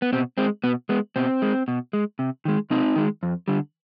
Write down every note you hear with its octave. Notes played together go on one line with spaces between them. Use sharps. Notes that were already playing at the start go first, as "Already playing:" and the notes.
B3
B2 C4
G#3 C4
B2 B3
G#3 B3
B2 C4
G#3
B2
G#3
C3
D#3 G#3
C3 C4 D#4
D#3 G#3
F2
D3 G3